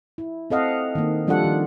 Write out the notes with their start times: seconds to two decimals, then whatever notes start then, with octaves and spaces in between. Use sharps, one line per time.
0.18 E4
0.50 C4 A4 D#5 F5 F#5
0.95 D#3 A#3
1.27 F3 G3 D4 F4 A4 F#5
1.44 D#3